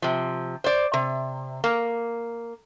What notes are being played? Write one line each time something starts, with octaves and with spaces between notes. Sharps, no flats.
C3 F3
C5 D5
C3
A#3